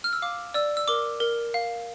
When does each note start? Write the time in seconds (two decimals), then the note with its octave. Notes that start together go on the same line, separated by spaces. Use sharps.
0.04 F6
0.13 E6
0.22 F5 D6
0.54 D5 E6
0.77 E6
0.88 A#4 D6
1.20 A#4
1.54 F5